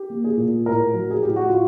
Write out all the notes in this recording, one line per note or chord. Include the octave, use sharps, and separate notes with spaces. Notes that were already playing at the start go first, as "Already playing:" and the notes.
Already playing: G4
A#3
G#4
A#2
A2 A#4
F#3
G#4
A2 G4
F#4
A2 F4